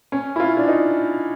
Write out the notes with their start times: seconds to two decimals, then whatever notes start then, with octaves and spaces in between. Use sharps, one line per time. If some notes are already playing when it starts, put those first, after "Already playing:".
0.12 C#4
0.36 E4
0.40 F4
0.57 D4
0.68 D#4